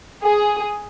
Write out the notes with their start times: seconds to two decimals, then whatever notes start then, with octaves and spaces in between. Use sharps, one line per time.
0.23 G#4